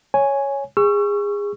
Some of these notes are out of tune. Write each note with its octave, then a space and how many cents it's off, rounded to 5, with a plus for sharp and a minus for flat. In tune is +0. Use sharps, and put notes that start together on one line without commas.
C#5 +0 G#5 +0
G#4 -25 C#6 +0 E6 +40